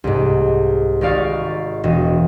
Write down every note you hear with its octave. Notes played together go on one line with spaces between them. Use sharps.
C2 G#2
G#1 D#4 D5 F5 C#6 A6
E1 D#5